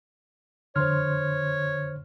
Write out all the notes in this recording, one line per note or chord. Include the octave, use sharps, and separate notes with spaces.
F2 D3 C5 C#5 C6 F6